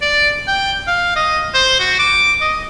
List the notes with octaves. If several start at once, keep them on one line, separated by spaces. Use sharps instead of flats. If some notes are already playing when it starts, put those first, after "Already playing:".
D5
G5
F5
D#5
C5
F#4
D6
D#5